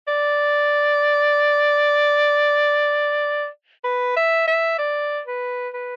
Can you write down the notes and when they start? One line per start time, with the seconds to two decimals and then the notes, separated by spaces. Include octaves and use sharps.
0.08 D5
3.84 B4
4.16 E5
4.47 E5
4.78 D5
5.26 B4
5.73 B4